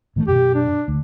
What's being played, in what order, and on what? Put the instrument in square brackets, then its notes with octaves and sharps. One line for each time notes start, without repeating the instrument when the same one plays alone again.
[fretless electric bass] A2 D#3 A3
[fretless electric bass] F#2 B2 [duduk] G4
[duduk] D4
[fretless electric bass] D2